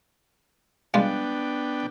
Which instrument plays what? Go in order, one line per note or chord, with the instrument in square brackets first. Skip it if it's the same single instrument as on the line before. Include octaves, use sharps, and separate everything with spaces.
[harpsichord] G3 G#3 F4 [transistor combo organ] B3 D4 G5